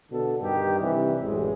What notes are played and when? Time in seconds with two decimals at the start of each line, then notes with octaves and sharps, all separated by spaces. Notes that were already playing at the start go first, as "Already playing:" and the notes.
0.12 B2 D3 A4
0.41 G2 D#3 G4
0.80 C3 E3 G3
1.22 A1 F#2 G#3